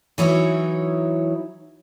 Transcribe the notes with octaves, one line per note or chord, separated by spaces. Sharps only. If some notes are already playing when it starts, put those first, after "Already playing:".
E3 F#3 D#4 E4 C#5